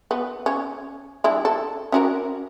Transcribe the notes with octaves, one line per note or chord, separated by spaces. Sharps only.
B3
C#4
G3 D4 E4
A4
C#4 F#4 A#4